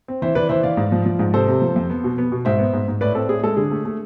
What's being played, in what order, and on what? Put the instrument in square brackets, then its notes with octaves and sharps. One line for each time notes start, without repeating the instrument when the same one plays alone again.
[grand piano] C4
E3 C5 E5
E3 B4 D5
E3 C5 E5
E3 D5 F5
G#2
F3
F3
G#2
C3 A4 C5
C3
F3
F2
B3
B2
B3
B2
G#2 C5 E5
B3
G#2
G#2
A2 B4 D5
C4 A4
A2 G#4
G#3 A4
D3 G#4
A3
A3